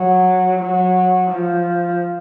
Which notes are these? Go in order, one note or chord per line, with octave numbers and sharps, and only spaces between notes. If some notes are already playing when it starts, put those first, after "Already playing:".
Already playing: F#3
F#3
F3